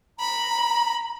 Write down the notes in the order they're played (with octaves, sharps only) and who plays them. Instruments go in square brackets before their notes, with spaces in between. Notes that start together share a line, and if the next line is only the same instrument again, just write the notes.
[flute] A#5 [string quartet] B5